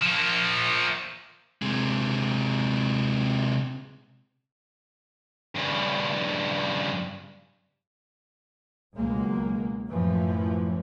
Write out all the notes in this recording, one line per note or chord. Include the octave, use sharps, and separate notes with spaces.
F3 A#3
C3 G#3
G2 C#3
C#2 B2 F#3 G#3 A#3
F#2 A2 E3 F3